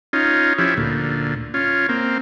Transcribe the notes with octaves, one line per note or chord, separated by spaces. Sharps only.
C#4 D#4 F4
F3 C#4 E4 G4
D2 A#2
C#4 F4
A#3 C4